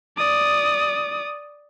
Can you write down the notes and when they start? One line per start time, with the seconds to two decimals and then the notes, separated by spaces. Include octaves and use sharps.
0.17 D5 D#6